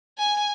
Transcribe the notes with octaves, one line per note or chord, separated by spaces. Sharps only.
G#5